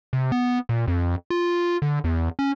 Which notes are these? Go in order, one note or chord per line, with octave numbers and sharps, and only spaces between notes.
C3
B3
A#2
F2
F4
D3
E2
C#4